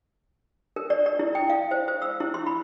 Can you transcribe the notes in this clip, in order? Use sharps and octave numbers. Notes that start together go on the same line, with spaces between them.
A#4
D5
D5
E4
G5
F5
C5
C5
E6
E4
C6
B5